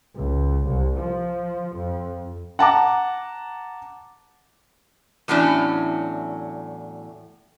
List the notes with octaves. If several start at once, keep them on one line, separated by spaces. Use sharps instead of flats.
C#2
C2
F3
F2
F#5 A5 A#5 D6
E2 A2 F#3 C#4 D4